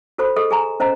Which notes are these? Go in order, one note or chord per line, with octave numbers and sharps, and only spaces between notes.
F#4 A4 C5 B5 C#6
G#4 A4 D#5
G#4 G#5 A#5 C6
C#4 C5 D#5 A#5